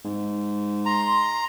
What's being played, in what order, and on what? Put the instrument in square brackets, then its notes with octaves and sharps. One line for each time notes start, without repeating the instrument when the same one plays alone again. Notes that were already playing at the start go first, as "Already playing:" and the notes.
[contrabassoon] G#2
[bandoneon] A#5 [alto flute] C6